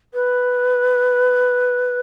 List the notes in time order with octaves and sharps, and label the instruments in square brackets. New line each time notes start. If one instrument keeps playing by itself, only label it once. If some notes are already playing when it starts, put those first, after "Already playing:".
[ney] B4